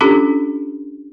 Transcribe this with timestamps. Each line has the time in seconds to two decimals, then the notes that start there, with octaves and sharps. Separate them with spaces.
0.01 C#4 D4 F4 G4 A4